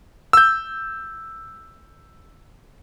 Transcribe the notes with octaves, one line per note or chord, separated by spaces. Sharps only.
E6 G6